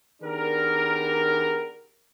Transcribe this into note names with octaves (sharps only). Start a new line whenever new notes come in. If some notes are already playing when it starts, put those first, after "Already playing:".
D#3 B3 D4 G4 G#4 A#4